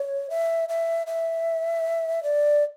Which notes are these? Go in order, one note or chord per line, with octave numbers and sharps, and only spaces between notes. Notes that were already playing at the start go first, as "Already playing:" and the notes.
Already playing: C#5
E5
E5
E5
D5